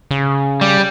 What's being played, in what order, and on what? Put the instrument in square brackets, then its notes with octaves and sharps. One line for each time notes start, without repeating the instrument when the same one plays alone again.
[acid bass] C#3
[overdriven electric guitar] G3